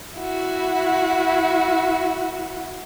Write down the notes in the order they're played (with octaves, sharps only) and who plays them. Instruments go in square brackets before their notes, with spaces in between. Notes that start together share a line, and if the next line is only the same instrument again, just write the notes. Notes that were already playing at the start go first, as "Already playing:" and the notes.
[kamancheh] E4 F#4